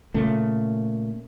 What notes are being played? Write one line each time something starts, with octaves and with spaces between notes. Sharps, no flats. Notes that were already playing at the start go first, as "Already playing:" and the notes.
A#2 C#3 A3